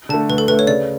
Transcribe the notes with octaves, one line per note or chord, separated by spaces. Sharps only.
D3 A3 A5
D2 B4
A4
D3 A3 B4
C#5
C#3 D5